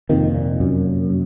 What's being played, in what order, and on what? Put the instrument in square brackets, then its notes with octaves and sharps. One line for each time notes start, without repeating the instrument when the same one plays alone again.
[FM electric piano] F2 C3 F3 A#3 [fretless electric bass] D#3
[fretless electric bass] A#2
F#2